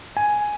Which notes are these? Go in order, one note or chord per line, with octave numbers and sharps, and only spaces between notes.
G#5